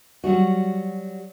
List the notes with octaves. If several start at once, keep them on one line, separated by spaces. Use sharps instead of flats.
F#3 G3 F#4